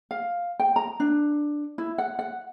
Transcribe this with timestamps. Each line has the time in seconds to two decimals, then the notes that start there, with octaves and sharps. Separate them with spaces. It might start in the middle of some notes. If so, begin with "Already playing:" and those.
0.11 F5
0.60 G5
0.76 A#5
1.00 D4
1.78 E4
1.98 F#5
2.19 F#5